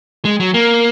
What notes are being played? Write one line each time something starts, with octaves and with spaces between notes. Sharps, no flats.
G#3
F#3
A#3